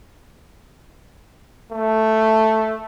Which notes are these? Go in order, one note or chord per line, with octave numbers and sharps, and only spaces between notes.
A3